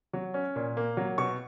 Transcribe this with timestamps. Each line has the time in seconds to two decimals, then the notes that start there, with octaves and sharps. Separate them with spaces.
0.13 F#3
0.34 C#4
0.56 A#2
0.77 A#3
0.97 F#3
1.18 B2 C#6